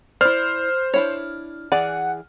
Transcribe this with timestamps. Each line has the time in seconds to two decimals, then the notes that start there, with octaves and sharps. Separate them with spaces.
0.21 E4 C5 D5 F6
0.94 D4 E4 C#5
1.72 E3 G#4 D5 F#5